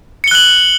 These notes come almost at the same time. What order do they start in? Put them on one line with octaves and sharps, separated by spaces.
C#7 G7 F#6 F#7